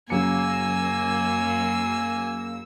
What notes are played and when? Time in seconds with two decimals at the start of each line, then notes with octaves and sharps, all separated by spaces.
0.10 F#2 C#3 F#3 A#3 G#5 E6 C#7